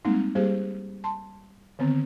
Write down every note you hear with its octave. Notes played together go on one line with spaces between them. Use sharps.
G3 G#3 A#3 C4 D#4
G3 A#3 G4 G#4 C5
A5 C6
D3 D#3 B3 C4